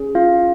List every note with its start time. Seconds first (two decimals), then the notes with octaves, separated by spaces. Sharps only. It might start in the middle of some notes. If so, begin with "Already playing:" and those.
Already playing: C#4 G#4
0.15 F4 F5